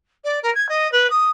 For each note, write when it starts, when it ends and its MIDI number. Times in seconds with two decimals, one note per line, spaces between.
0.24 0.39 74
0.42 0.53 70
0.54 0.66 92
0.69 0.90 75
0.91 1.07 71
1.10 1.29 87